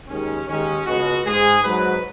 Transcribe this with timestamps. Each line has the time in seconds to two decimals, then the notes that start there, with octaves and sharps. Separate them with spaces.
0.08 D#2 D#3 G#3 C#4
0.47 D#2 D#3 G#3 C#4
0.85 C#2 B2 G#3 F#4
1.24 G#2 G#3 G#4
1.63 G#2 F#3 B4